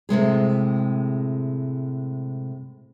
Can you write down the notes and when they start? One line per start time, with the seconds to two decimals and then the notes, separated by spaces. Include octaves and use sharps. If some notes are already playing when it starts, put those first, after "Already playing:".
0.09 A2 C3 G#3 G#4